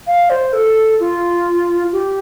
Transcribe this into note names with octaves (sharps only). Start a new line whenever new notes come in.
F5
C5
A4
F4
G4